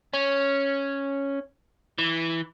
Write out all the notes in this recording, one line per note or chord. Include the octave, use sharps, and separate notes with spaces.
C#4
E3